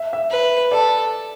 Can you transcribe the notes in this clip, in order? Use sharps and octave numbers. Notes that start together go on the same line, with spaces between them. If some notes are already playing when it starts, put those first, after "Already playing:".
Already playing: E5
E5
B4
A4 D5